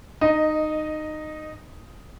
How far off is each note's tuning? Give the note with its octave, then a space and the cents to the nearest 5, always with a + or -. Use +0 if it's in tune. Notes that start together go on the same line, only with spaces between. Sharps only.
D#4 -15 D#5 +0